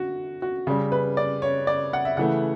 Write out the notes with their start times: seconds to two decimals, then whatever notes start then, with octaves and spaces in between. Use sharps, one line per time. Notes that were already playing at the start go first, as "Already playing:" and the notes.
Already playing: D3 F#4
0.42 F#4
0.67 C#3 G3
0.92 B4
1.17 D5
1.42 C#5
1.67 D5
1.93 F#5
2.05 E5
2.17 C#3 E3 A3 F#5